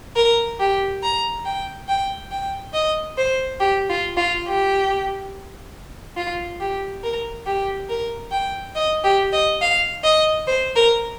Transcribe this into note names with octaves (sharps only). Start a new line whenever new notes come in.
A#4
G4
A#5
G5
G5
G5
D#5
C5
G4
F4
F4
G4
F4
G4
A#4
G4
A#4
G5
D#5
G4
D#5
F5
D#5
C5
A#4